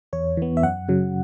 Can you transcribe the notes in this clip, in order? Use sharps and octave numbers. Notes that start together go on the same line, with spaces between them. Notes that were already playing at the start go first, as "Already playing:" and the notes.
E2 C#5
E3 B3
E5
F#2 F#5
C#3 F#3